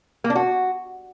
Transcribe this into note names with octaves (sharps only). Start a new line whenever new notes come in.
A#3
D4
F#4